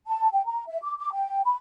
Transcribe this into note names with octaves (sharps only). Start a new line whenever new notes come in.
A5
G5
A#5
E5
D6
D6
G5
B5